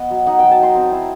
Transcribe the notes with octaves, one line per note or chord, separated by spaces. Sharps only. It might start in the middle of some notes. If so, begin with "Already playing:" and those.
Already playing: B3 D#5
F#3
D#4 F#5
F#3 G5
A5
D#4 C6
C4
E4